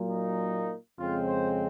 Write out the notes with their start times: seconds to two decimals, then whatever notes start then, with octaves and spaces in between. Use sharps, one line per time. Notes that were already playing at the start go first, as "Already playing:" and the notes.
Already playing: A#2 F#3 A#3
0.08 D#4
0.98 F2 C#3 G#3 C4 F4
1.27 C5